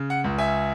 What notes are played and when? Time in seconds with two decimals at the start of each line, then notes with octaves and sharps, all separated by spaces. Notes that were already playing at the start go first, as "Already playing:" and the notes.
Already playing: C#3
0.10 F#5
0.24 C#2
0.38 E5 G#5